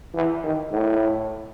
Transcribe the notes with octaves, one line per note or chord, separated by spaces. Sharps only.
E3
D#3
A2